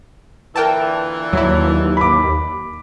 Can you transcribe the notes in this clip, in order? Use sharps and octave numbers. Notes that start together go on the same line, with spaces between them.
A#2 D3 E3 A#4 G5 A5
D#2 F#3 E4
B5 D6